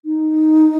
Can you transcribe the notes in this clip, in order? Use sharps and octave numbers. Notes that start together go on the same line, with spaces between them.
D#4